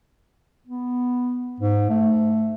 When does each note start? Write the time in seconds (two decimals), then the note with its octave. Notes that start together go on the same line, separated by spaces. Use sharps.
0.67 B3
1.60 G#2
1.90 A3